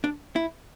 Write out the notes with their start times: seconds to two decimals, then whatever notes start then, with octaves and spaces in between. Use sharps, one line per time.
0.04 D4
0.36 E4